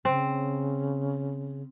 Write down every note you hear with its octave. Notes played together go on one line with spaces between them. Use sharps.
C#3 C4